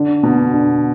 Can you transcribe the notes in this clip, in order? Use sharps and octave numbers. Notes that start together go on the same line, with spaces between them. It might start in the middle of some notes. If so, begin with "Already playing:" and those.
Already playing: D3
B2
D3